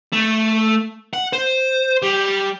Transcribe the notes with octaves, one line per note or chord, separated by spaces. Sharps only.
A3
F#5
C5
G3